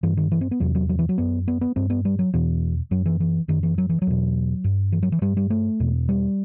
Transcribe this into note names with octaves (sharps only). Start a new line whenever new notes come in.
G2 E3
D#3
E3
C4
B3
E2 C3 F#3
F#3
F#3
E3
F#3
F#2 B3
B3
B3
G2 C4
B3
G3
F#3
E2 B2 E3
F#2 F#3
E3
E3
F#2 D#3
E3
F#3
E3
F#3
E2 B2
G2
E3
F#3
E3
G2 G3
G3
A3
E2 B2
G3